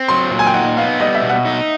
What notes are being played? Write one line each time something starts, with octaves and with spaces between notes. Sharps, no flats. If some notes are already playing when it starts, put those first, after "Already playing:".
Already playing: C4
F#3 C6
A#2
G#5
G5
D#4 F#5
B3 F5
G3 D#5
E5
B2
F#5
D#4